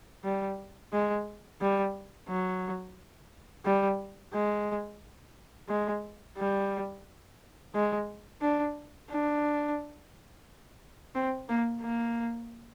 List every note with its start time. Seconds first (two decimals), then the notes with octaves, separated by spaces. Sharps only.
0.24 G3
0.92 G#3
1.61 G3
2.28 F#3
3.65 G3
4.33 G#3
5.69 G#3
6.38 G3
7.74 G#3
8.42 D4
9.09 D4
11.15 C4
11.48 A#3
11.82 A#3